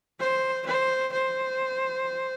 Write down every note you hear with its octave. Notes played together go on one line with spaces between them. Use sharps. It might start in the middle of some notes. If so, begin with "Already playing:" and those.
C5
C5
C5